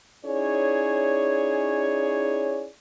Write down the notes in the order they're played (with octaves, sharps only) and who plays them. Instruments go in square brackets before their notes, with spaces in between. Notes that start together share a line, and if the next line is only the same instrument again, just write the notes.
[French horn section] C#4 D#4 E4 G#4 C#5 D5